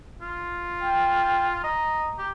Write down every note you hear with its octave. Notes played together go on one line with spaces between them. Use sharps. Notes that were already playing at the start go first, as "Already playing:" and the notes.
F4
G5
D#5 A#5
G4